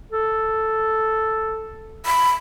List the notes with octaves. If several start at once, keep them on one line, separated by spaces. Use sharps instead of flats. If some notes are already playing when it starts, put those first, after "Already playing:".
A4
B5